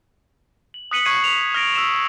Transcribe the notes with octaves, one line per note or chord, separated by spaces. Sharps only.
F#7
D#6 F#6 B6 C#7 D#7 F#7
C#6 D#6 F#6 G#6 C7 D#7
F7
F6 A#6 D7
E6 F6 E7